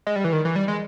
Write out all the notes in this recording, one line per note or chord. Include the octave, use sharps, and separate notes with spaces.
G#3
G3
E3
D#3
E3
G3
G#3